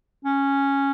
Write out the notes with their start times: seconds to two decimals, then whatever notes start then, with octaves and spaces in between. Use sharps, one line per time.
0.25 C#4